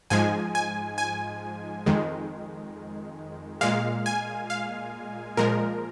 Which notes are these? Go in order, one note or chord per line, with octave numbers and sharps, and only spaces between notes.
G#2 F3 G#3 G#5
G#5
G#5
F2 D#3 G#3
A#2 G#3 F5
G#5
F5
A#2 F3 G#3 A#4